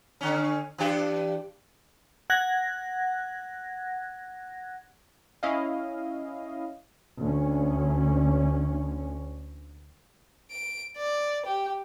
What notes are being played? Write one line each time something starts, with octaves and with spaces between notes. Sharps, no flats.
D3 C#4
E3 D4 G4
F#5 F#6 G#6 A#6
C#4 E4 D#5 F5
D2 C#4
D7
D5
G4